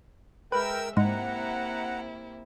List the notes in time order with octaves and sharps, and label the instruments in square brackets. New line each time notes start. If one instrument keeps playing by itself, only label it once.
[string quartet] G#3 E5 E6 [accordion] A#4 G5 [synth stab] B4
[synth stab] G#2 [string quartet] C3 A#3 E4 [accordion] F#5 A#5